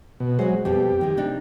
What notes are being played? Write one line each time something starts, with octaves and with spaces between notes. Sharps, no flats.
B2
F#3 G#3 F#4 C5
F2 B2 G3 G4
D#3 G#3
C3 D4 D#4